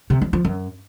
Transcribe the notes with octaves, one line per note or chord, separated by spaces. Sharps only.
C3
F3
F3
F#2